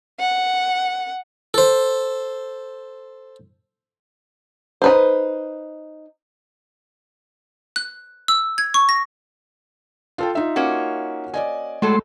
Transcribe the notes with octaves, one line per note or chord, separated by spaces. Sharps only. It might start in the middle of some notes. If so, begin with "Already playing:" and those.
F#5
A4 C5
D#4 B4 C5
F#6
E6
G#6
C#6
A#6
F4 A4 G5
D#4 F4 E5
A#3 C#4 F#4
D5 D#5 G#5
A2 F#3 G#3 A3 A4 C6